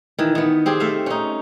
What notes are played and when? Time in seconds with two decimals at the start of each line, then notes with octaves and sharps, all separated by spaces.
0.19 D#3 E3
0.35 D#3 B3
0.66 C4 G4 G#4
0.80 A3 E5 F5
1.06 C#4 D#4